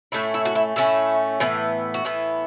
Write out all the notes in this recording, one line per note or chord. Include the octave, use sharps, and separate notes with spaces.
A2 A3 C#4 E4
E4
F#4
E4
A2 A3 C#4 E4
A2 E3 B3
F#4
A2 E3 B3 E4